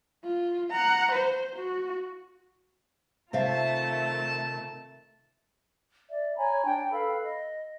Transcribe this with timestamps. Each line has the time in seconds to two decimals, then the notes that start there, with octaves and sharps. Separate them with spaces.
0.24 F4
0.70 F#5 A#5
1.12 C5
1.56 F#4
3.33 C3 D#3 A3 F4 E5 F5 A5
6.09 D5 E5
6.36 C#5 G#5 A#5 B5
6.64 D4 G5
6.91 A4 B4 F5 B5
7.22 D#5